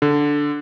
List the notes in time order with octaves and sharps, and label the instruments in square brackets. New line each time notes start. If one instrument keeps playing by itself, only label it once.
[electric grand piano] D3